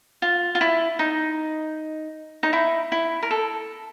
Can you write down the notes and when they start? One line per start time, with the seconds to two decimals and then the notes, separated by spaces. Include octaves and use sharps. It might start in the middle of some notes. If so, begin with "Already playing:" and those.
0.22 F4
0.55 F4
0.61 E4
0.99 D#4
2.43 D#4
2.53 E4
2.92 E4
3.23 A#4
3.31 A4